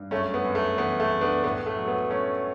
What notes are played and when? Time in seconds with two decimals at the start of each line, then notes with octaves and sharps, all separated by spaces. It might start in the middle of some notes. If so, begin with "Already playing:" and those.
Already playing: G2
0.11 F#2 A3 C#4
0.34 B3
0.44 F#2
0.55 A3
0.78 E3 B3
1.00 A3
1.11 F#2
1.21 B3 D4
1.44 A2 B3
1.66 A3
1.77 F#3
1.88 B3
2.10 F#3 A3 C#4